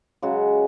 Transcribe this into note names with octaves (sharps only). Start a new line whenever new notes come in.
C#3 F#3 G#3 F#4